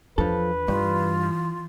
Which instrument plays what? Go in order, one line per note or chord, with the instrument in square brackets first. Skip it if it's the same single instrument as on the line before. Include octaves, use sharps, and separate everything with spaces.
[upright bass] E2 D4 [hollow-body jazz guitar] F3 A4 [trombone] B4
[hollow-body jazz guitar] G2 [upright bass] E3 [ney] F4